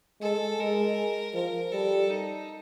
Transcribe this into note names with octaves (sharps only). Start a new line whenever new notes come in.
G#3 A4
G#3 A#4
F3 A#4
G3 A4
D#4